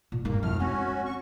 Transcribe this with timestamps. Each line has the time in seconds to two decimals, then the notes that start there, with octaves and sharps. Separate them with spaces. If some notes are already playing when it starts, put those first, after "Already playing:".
0.12 A#2
0.25 G2 A#3 D#4
0.43 F2 A2 A3 F6
0.59 G#3 C4 C#4 F#4
1.06 C#6